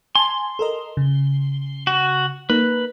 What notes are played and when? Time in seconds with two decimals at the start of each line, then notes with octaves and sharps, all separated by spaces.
0.15 G#5 A5 C6
0.59 A4 A#4 D#5
0.97 C#3
1.87 F#4
2.50 A#3 D#4 A#4 B4